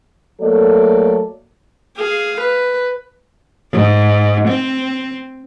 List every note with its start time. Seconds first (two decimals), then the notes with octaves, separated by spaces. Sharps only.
0.41 F#3 A3 A#3 A4 D5
1.98 G#4 F5
2.40 B4
3.72 G#2
4.48 C4